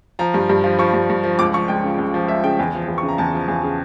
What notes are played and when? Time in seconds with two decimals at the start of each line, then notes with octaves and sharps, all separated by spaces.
0.19 F3 A#5
0.34 G2
0.49 G2
0.64 F3
0.79 F3 C#6
0.94 G2
1.10 G2
1.24 F3
1.39 C#2 D6
1.54 F3 C#6
1.68 C#2 G5
1.84 C#3
1.98 C#2
2.14 F3
2.28 C#2 E5
2.44 C#3 G5
2.59 E2
2.74 F3
2.88 E2
2.98 C#6
3.03 C#3
3.09 A#5
3.18 E2 A5
3.34 F3
3.48 E2
3.63 C#3